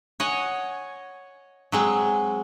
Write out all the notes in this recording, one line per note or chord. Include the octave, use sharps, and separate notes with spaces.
C#5 D#5 F#5 G#5
F#3 G#3 C4